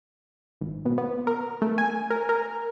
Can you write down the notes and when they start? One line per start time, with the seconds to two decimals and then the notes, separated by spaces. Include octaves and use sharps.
0.61 G#1
0.85 B2
0.98 B3
1.27 A#4
1.62 A3
1.78 G#5
2.10 A#4
2.29 A#4